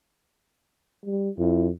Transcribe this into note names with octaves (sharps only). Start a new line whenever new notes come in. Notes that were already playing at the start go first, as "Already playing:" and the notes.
G3
F2 E4